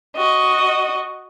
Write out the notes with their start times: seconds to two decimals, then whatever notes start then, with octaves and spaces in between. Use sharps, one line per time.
0.16 F#4 D#5